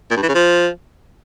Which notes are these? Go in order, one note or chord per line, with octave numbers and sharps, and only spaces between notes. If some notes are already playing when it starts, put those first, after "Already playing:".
A#2
G2
E3
C#3
F3